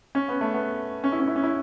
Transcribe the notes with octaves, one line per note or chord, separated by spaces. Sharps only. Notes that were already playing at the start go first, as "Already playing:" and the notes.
C#4
B3
A3
B3
C#4
E4
C#4
E4
C#4
E4